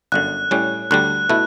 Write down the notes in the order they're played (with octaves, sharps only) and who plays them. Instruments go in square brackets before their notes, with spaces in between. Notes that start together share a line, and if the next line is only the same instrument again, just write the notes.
[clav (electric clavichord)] G1 F#2 D3 [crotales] F#6
[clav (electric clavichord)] A2 G3 C#4
[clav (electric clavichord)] D2 D3 G3 [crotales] F#6
[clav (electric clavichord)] B2 A3 E4